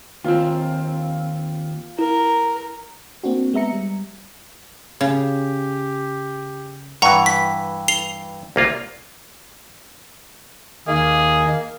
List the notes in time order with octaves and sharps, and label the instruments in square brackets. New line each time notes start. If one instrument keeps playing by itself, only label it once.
[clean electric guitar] D#2 C4 [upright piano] F4
[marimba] E4 [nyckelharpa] A#4
[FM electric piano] A#3 C4 D4 F#4
G#3 B3 E5 A#5 C#7
G3
[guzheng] C#3 [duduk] G4
[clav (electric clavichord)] G2 E3 [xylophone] F#5 A#5 C#6
[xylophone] B6
C7 F7 G7
[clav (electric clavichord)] C2 A#3 F4
[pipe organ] D#2 D#4 [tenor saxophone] A#3 [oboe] G#4